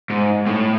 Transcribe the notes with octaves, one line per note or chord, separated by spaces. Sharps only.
G#2
A2